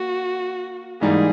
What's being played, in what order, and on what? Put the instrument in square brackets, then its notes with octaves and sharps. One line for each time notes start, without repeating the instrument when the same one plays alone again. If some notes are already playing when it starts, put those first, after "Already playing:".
Already playing: [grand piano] A#3 [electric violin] F#4
[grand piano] G#2 E3 G3 A#3 D#4 [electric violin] G#4